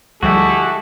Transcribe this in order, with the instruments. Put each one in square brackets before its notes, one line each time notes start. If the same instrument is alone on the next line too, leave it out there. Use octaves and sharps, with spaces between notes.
[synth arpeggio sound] D2 F3 G3 [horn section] G#3 E4 G4 [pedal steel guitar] F#4 [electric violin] A4